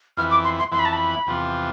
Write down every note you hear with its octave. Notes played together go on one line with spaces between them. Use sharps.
F2 E3 B3 E4 F6
D6
C6
C6
F2 E3 B3 E4 C6
B5
A5
B5
E2 C3 F3 B3 F4